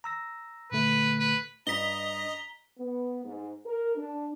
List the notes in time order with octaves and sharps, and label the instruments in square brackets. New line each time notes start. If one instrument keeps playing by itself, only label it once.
[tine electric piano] A#5 E6 A#6
[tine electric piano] A#2 D3 A3 [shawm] B4
[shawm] B4
[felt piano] G2 [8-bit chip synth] D#5 [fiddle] A#5 [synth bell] B6 G7
[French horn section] B3
G#2
A#4
D4